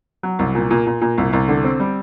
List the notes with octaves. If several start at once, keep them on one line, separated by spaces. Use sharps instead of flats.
F#3
C2
A#2
A#2
A#2
A#2
C2
C2
D3
C4
G3